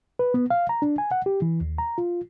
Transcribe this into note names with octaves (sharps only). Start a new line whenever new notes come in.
B4
B3
F5
A#5
D4
G#5
F#5
G4
E3
D#2
A#5
F4